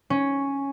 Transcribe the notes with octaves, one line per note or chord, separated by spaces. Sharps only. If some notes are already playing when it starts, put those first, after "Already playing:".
C#4